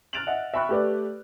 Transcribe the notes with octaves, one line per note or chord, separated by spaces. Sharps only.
F6 F#6 A6 D7 F7 F#7
D#5 E5 F#5
E5 G5 B5 C#6 F#6
A3 G4 B4 D5